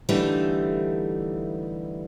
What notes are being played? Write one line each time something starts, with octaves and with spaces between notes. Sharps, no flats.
D3 E3 G3 A3 D#4